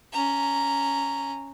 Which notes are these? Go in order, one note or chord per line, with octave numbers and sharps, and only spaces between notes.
C#4 A#5